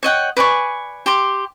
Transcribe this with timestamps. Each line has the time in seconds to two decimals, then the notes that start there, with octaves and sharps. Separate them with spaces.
0.03 C#5 D#5 F#5 G5
0.37 B4 D5 G#5 C#6
1.06 G4 C6 D6